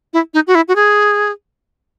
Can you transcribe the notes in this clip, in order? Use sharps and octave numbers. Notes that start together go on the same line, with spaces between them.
E4
D#4
F#4
E4
F#4
G#4